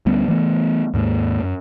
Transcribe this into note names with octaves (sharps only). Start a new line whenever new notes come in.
D2 G3 B3 C#4
E3 A3 B3
D#2 G#2 A#3
F#2